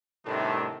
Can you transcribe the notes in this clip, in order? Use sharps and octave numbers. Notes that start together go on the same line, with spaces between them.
A2 C3 D#3 G3 A3 D4